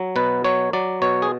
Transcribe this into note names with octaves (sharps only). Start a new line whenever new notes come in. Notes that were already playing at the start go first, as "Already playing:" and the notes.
Already playing: F#3
B2 B4
F#3 C#5
F#3 D5
B2 C#5
G#4